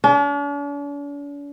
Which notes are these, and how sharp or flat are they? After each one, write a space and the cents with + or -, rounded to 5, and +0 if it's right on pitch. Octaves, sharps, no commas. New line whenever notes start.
D4 -45